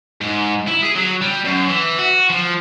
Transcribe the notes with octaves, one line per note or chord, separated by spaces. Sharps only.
G#2
E4
G#4
F#3
G3
F#2
E3
F#4
F3